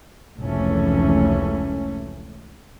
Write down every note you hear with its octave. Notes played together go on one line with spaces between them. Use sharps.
F1 C#2 E3 A3 C#4